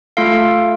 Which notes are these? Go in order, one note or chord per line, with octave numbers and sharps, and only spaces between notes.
A3 F4 A4 F5